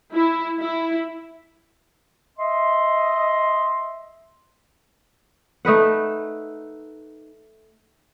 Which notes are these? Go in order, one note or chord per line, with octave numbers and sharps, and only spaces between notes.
E4
E4
D#5 E5 C6
A3 D#4 B4 F#5